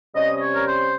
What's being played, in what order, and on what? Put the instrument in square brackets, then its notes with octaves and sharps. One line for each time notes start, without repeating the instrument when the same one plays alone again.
[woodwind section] C3 G3 C#4 D#5
D#5
C#5
A#4
C5